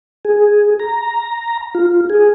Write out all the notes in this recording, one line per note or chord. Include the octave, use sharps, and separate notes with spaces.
G#4
A#5
F4
G#4